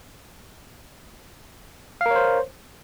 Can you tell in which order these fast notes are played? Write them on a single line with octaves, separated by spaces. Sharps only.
F5 A#4 C#5 C5